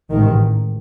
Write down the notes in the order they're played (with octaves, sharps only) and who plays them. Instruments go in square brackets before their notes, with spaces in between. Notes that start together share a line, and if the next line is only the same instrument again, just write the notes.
[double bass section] A1 G#2 D#3